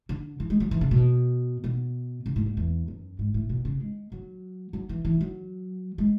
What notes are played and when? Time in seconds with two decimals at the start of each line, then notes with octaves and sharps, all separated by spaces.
0.09 D3
0.40 E3
0.50 G#3
0.60 F#3
0.71 E3
0.81 C#3
0.91 B2
1.64 B2
2.26 C#3
2.36 A2
2.46 G#2
2.57 E2
2.88 F#2
3.19 G#2
3.34 A2
3.49 B2
3.65 C#3
3.81 G#3
4.12 F#3
4.73 F#3
4.89 E3
5.05 E3
5.21 F#3
5.98 G#3